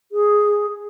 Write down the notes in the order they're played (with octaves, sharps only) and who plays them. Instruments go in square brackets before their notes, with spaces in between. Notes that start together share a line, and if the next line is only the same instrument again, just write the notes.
[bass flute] G#4